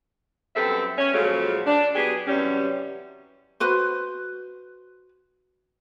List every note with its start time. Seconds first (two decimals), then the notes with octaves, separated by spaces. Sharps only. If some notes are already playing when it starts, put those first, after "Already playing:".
0.55 F#2 G3 B3 C4 A4 E5
0.98 C#4
1.14 A#2 C#3 F3 F#3 G#3 A3
1.66 D4
1.94 F#3 B3 G4 G#4
2.27 F#2 C3 E3 G3 C#4
3.60 F#4 B4 C5